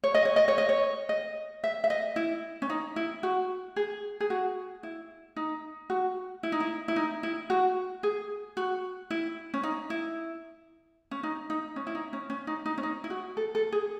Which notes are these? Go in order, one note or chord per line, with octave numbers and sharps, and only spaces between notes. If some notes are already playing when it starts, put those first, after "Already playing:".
C#5
D#5
C#5
D#5
C#5
D#5
C#5
D#5
E5
E5
D#5
E4
C#4
D#4
E4
F#4
G#4
G#4
F#4
E4
D#4
F#4
E4
D#4
E4
E4
D#4
E4
F#4
G#4
F#4
E4
C#4
D#4
E4
C#4
D#4
D#4
C#4
E4
D#4
C#4
C#4
D#4
D#4
C#4
D#4
E4
F#4
A4
A4
G#4